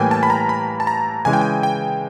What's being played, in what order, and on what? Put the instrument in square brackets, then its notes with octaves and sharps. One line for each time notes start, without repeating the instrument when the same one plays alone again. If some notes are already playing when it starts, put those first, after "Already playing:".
Already playing: [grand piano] A2 E3 G3 A#3 [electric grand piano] G5 G#5
[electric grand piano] A5
B5
A#5
B5
A5
A#5
[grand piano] C#3 E3 G#3 [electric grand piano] G#5
[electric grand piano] G5
G#5
G5